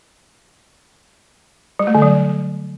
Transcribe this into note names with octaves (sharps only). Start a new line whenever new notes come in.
G3
A3
D3
F#3